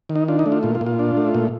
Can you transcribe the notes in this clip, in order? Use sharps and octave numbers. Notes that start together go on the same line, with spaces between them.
D#3
D#4
D4 F4
D#4
A3
F4
A#2 F4
F4
A#2
F4
D4
A3
A#2